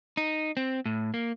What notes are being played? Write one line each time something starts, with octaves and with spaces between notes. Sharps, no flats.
D#4
C4
A2
A#3